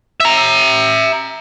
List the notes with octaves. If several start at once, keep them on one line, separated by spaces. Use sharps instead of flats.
E5 A#5